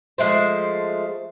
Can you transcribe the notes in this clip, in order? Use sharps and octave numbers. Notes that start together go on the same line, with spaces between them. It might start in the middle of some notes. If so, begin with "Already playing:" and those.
F3 G#3 A3 C5